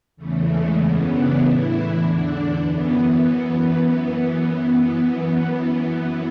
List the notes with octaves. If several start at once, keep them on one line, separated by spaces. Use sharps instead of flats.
E2 C#3 E3 A3
G#3
F#2 C#3 E3 B3
D4
A2 E3 E4
E2 D3 D4
F#2 E3 B3